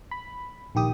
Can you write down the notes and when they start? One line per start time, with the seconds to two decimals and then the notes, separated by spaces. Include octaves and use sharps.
0.11 B5
0.75 A#1 D#3 G4 D#6